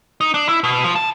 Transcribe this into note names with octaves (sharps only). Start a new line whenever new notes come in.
D#4
D4
E4
B2
F3
A5